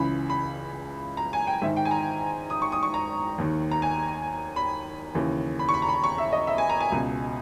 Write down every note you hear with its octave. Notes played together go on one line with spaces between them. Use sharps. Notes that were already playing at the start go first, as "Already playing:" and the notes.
Already playing: C#2 C#3 E3 B5
B5
A#5
G#5
G5
G#2 D#3 E5
G5
G#5
A#5
D#6
C#6
D#6
C#6
A#5
D#2 D#3
A#5
G#5
B5
D#2 C#3 E3
B5
C#6
B5
A#5
B5
C#6
E5
D#5
E5
G#5
A#5
G#5
C#2 B2